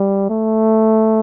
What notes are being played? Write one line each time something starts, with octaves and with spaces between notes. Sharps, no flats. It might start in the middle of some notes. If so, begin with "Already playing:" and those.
Already playing: G3
A3